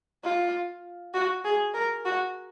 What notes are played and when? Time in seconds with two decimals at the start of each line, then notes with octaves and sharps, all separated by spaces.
0.24 F4
1.14 F#4
1.44 G#4
1.74 A#4
2.05 F#4